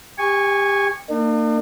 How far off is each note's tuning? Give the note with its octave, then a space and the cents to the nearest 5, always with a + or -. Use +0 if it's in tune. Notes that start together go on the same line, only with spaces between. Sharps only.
G4 +25 G#5 -15 C#6 +0
A#3 -30 D4 +45